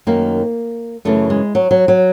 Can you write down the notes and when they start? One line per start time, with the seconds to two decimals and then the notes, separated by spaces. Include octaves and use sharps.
0.07 F#2 D#3 A#3
1.05 F#2 C#3 E3 A3
1.30 G#3
1.55 F#3
1.71 F#3
1.88 F#3